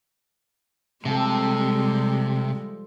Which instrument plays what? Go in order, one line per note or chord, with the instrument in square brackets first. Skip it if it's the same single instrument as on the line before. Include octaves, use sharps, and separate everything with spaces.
[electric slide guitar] C3 [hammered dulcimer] F3 G4 A4 [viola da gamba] G3 G#3